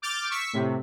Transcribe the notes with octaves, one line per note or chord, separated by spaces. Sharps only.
D6 F6 G6 A6
C#6 E6 B6
A2 C3